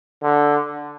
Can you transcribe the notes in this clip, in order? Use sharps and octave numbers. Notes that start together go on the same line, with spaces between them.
D3